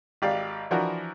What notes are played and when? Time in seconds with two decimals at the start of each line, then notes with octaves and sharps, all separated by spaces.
0.22 G#1 G4 D5 F5
0.71 E3 F3 D4 E4 F#4 A#4